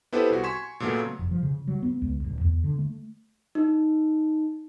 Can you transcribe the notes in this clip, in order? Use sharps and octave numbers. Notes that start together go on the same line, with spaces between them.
B3 E4 G4 A4 B4 C5
C2 F#4
G#5 C6 C#6 G#6 B6 E7
A#2 C#3 F#3 A3 B3
F1
F3
C#3
F#3
B3
C#2
D1
E2
D3
A3
D#4